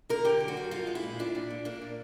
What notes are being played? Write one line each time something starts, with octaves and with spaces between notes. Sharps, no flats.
D3 A#4
D3 G4
F#2
F#4
F#2
F3 F4
G#3
E4
A#2
F3 D4
A#2
A#2
A#3 D4
A#2